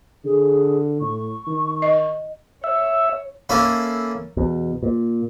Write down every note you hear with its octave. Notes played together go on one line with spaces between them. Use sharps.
D3 G#4
A2 C#6
D#3
D#5
C#5 E5
A#3 C#4 E4 A4
E2 B2
A#2